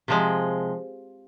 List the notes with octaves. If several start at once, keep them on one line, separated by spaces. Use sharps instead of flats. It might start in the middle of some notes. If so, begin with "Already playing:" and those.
C3 F3 G#3